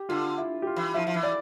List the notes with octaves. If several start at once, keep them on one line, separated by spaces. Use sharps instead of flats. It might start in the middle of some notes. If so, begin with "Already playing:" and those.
Already playing: G4
D3 F4
E4
G4
F4
E3
F3 E4
F3
E3
D5